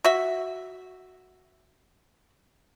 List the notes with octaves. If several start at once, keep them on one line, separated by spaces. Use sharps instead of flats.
F#4 E5